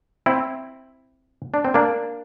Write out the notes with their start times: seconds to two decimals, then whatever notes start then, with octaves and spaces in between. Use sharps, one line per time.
0.26 C4 E4
1.54 D4
1.65 C4
1.74 A#3 D4